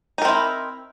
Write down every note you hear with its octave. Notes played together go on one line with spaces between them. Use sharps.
C4 D#4 E4 A#4